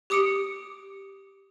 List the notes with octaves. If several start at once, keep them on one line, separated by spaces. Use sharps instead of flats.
G4 D6 D#6 C#7 D7